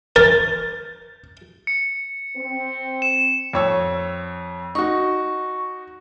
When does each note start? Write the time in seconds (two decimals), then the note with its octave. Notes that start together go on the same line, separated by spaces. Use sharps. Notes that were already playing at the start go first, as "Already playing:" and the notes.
0.16 A#4 A6
1.67 C#7
2.36 C4
3.02 E7
3.53 F2 C#5 E6
4.75 D#4 F#4 C#6